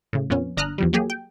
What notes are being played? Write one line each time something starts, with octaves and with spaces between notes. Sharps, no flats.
A2 C#3
F2 A#2 B3 C#4
G1 D4 A#5 D#6 F6 F#6
E2 F3 G3
F#3 A#3 G4 G#4
G5